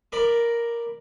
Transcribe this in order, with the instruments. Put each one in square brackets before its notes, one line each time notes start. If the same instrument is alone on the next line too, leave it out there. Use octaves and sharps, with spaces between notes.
[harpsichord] A#4 D5 B5